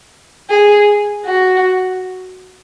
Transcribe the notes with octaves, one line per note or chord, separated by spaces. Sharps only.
G#4
F#4